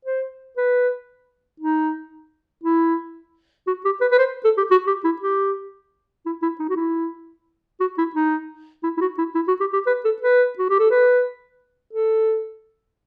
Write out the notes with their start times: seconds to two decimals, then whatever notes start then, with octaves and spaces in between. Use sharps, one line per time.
0.05 C5
0.57 B4
1.60 D#4
2.63 E4
3.67 F#4
3.85 G4
4.01 B4
4.11 B4
4.19 C5
4.44 A4
4.57 G4
4.71 F#4
4.87 G4
5.04 E4
5.22 G4
6.26 E4
6.42 E4
6.60 D#4
6.69 F#4
6.76 E4
7.80 F#4
7.98 E4
8.15 D#4
8.83 E4
8.97 E4
9.01 F#4
9.18 E4
9.35 E4
9.48 F#4
9.60 G4
9.73 G4
9.87 B4
10.05 A4
10.22 B4
10.59 F#4
10.70 G4
10.80 A4
10.91 B4
11.93 A4